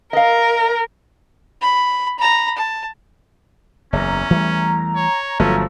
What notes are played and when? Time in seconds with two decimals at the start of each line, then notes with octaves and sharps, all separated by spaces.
0.13 A#4 D#5 F5
1.62 B5
2.19 A#5 B5
2.57 A5
3.93 F#1 E2 C#4 A#5
4.30 E3 G3 A3
4.95 C#5
5.40 G1 F3 F#3 A3 C#4